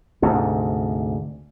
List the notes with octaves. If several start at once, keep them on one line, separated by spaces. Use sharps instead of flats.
D2 G#2 C3